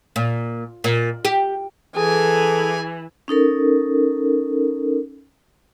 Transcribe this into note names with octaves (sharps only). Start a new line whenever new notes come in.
A#2
A#2
G4
E3 G#4 A4 G#5
C#4 D#4 A4 A#4